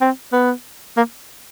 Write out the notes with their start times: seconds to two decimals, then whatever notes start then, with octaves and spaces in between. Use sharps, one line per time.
0.01 C4
0.32 B3
0.97 A#3